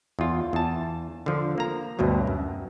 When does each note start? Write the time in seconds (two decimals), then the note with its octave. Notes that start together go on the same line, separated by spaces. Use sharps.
0.19 E2 F4
0.53 E2 A5
1.26 D3 F3
1.58 A#3 A#5
1.99 D2 G2 B2 F#3
2.27 F#2